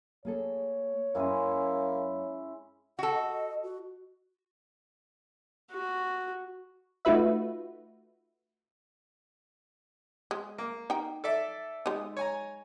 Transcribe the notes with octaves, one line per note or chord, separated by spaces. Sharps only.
A#3 G#4 A4 C#5
F#2 G#3 A#3 C#4 E4 G#5
F#4 A4 F#5
D#5
F#4
F#4
A3 D#4 F4 F#4 B4 E5
G#3
A#3
D#4 G5
A4 D5 E5
G#3 D#4
C#5 G#5 A#5